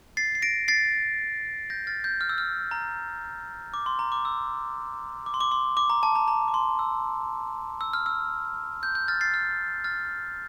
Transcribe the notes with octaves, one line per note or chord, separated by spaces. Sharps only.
A6 C7
C7
A#6 D7
A6 C7
G6 A#6
F6 A6
G6
F6
E6
F6
A#5
D6
C6
A#5
D6
E6
D6
C6
D6
C6
D6
A#5
A5
A#5
A#5
D6
C6
E6
E6
F6
E6
G6
G6
F6 A6
A6 C7
F6
F6 A6